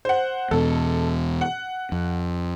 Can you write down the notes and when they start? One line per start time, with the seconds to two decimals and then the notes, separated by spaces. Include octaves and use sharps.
0.05 C5 F#5
0.51 E2 B2 A4
1.41 F#5
1.92 F2